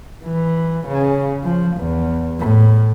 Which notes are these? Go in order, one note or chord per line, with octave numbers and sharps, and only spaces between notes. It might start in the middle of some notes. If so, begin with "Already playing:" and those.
E3
C#3
F3
E2
A2